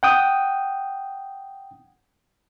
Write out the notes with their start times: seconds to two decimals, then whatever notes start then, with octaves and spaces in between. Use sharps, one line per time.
0.03 F#5 G5 D#6